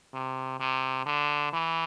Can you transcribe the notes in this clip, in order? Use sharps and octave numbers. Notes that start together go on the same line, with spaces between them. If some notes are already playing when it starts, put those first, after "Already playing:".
C3
C3
D3
E3